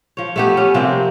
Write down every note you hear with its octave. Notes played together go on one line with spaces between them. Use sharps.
F3 C#5
A3 B3 G4
C#4
C3 F3 A#3 C4